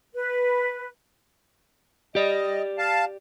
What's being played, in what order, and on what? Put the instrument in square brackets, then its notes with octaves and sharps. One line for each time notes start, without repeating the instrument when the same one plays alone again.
[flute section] B4
[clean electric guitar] G4 D5 [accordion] D#5
[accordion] F5 A5